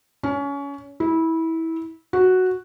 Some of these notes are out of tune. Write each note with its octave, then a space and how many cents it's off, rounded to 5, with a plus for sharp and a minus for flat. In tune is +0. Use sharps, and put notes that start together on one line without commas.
C#4 +25
E4 -20
F#4 +0